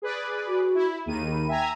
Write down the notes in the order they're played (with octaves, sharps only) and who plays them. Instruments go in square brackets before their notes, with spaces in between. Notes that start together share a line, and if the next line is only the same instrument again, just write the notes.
[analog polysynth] G#4 B4 D5
[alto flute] F#4
[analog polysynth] E4
[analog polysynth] D#2 D#3 D#7 [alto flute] G#4
[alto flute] B5
[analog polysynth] E5 G#5 A#5 [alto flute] G5